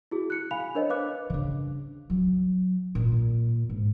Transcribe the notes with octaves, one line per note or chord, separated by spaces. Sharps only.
E4 F#4 G#4
F#6 C#7
F5 G#5 B5 F7
D4 A#4 C5 C#5 D#5
B4 F5 D6 F#6
C#3 D4
F#3
A#2
G#2